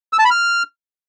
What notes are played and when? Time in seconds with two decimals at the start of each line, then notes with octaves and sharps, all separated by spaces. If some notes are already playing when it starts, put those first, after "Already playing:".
0.13 E6
0.19 A5
0.25 B5
0.31 F6